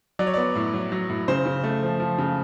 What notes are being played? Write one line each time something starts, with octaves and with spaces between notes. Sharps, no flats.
F#3 D5
C#5
B3 D5
A2
F#3
F#3
A2
C#3 C5
C#3
A3
F3
F3
C#3